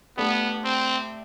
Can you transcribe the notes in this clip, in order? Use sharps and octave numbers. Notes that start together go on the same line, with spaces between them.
A3 B3 D4 G4
C4